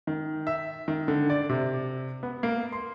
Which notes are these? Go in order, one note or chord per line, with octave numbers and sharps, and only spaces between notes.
D#3
E5
D#3
D3
D5
C3
B3
A#3
C6